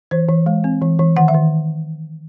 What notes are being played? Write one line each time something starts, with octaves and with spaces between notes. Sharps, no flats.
E3 C5
E3
G#3
C4
E3
E3
D#3 F#5
E5
D#3